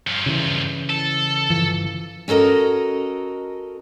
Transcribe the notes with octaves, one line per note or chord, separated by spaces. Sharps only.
G2 F3
C#3 E3
A4
G1 E3 F3
C#4 F#4 A4 A#4 D#5